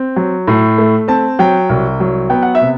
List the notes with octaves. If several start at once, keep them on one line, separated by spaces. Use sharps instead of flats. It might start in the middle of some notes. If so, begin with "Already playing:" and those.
Already playing: C4
F#3
A2
A3
C4 A5
F#3 G5
C2
F#3
B3 G5
F#5
E5
C3